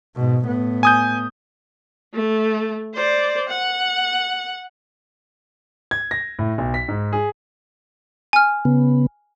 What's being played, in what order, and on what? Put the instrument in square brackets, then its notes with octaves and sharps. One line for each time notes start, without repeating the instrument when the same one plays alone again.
[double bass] G#2 B2
A2 B3
[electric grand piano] G#5 D#6 G6
[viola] A3
C5 D5
F#5
[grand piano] G#6
A#6
A2
B1
B6
G#2
G#4
[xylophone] G#5 F6
[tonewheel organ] C#3 B3